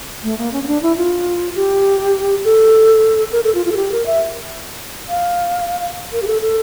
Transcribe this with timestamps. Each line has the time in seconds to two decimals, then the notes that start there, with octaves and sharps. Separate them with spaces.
0.24 A3
0.39 A#3
0.53 C#4
0.64 C#4
0.67 D4
0.82 E4
0.97 F4
1.56 G4
2.45 A4
3.32 A#4
3.44 A4
3.55 F4
3.66 F4
3.72 A4
3.76 G4
3.92 A#4
4.06 E5
5.09 F5
6.13 A#4
6.22 G4
6.27 A4
6.42 A4